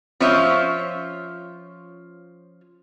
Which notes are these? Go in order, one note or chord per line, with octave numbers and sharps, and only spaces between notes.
F3 C#4 F4 C5 C#5 E5